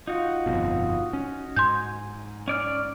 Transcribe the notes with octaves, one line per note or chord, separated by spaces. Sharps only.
D#4 F4 F#4
G1 F2 B2
C#4
G#2 G#5 C6 G6
C#4 D5 F6